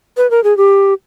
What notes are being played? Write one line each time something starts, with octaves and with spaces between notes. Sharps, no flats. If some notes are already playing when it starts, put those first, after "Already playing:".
B4
A#4
G#4
G4